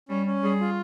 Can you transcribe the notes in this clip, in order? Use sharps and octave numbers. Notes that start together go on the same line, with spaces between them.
G3 C#4
C#4
G3 G#4
F4